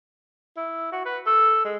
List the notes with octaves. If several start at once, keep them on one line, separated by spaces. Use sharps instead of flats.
E4
F#4
B4
A4
G#3